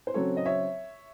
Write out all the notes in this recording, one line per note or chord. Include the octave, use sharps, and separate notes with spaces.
C5
C#3 F#3 C4 A4 C#5
D#5
C#5 E5